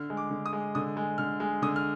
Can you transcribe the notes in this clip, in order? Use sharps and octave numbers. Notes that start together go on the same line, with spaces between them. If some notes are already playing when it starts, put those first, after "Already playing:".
Already playing: D3 F6
G#3
D6
D3
D#6
G#3
D3 D#6
G#3
D3 F6
G#3
D3 D#6
F6